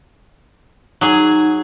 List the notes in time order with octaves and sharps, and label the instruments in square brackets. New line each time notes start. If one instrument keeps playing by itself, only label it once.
[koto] F#3 G#4 [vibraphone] D#4